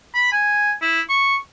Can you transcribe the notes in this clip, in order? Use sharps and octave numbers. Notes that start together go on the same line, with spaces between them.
B5
G#5
E4
C#6